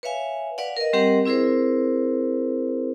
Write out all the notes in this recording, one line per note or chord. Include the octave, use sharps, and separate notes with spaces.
B4 C#5 E5 F5 G#5
B4 D5 F5 F#5
A#4 D#5
G3 C4 G4 A#4 D#5 F#5
C4 E4 G#4 A#4 C5